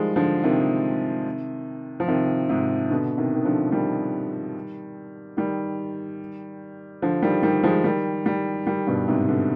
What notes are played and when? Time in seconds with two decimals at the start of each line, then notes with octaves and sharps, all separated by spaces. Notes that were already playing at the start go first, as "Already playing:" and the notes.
Already playing: D#3 F3 G3 G#3
0.16 D3 F3
0.44 C3 D#3
2.00 F3
2.08 C3 D#3
2.49 G#2 C3
2.90 B2 D3
3.17 C3 D#3
3.33 D#3
3.45 D3 F3
3.72 D#3 G3
5.37 D#3 G3
7.02 D3 F3
7.22 D#3 G3
7.43 D#3 G3
7.63 F3 G#3
7.84 D#3 G3
8.25 D#3 G3
8.67 D#3 G3
8.87 G2 B2
9.08 G#2 C3
9.28 B2 D3